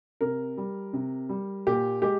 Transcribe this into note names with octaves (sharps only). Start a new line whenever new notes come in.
C3 A#4
G3
C3
G3
A#2 G4
G#3 G4